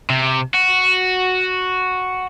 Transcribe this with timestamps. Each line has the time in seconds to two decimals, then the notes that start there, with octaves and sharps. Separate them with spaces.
0.10 C3
0.54 F#4